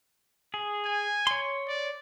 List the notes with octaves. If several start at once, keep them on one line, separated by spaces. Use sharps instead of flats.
G#4
G#5
C#5 C6
D5